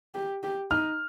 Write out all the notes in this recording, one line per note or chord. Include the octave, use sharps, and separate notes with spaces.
G4
G4
D#4 F6